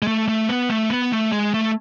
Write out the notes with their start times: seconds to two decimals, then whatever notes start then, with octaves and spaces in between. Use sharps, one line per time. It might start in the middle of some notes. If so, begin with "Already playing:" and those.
0.02 G#3
0.07 A3
0.28 A3
0.49 B3
0.70 A3
0.90 B3
1.12 A3
1.32 G#3
1.54 A3